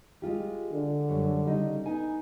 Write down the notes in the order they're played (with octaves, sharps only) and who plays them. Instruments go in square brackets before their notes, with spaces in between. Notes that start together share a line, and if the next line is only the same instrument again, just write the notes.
[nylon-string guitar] G#3 F4 G4
[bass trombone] D3
[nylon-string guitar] F#2 G3 C#5
C#3 G3 D#4
B3 D#4 G#5